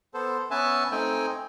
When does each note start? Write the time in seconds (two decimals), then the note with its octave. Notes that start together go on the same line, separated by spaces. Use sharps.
0.14 B3 A4 C5
0.51 B3 C#4 B4 E5 G#5 A5
0.92 A3 C4 D#4 G5 G#5